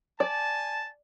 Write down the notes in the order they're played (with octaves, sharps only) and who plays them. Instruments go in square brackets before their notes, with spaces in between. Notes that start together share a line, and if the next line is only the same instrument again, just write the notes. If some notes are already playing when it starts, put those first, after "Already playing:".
[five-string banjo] D5 [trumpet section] G#5 A5